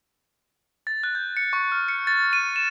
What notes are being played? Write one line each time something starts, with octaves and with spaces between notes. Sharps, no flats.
A6
F#6
G6
C#7
C#6
F6
C#7
A6
D#7
E7